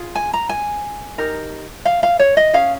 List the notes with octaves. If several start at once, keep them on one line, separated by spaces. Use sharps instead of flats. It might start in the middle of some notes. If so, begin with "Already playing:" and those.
Already playing: F4 G#4
G#5
A#5
G#5
D#4 G4 A#4
F5
F5
C#5
D#5
C#4 G#4 F5